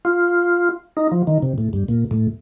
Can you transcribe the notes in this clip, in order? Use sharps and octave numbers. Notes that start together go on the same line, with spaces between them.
F4
D#4
F3
D#3
C3
A2
G2
A#2
A2